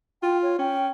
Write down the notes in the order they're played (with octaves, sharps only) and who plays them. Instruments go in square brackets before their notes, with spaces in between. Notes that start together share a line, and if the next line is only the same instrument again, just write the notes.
[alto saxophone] F4 [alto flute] G5
[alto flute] C#5
[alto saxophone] C#4 [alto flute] G5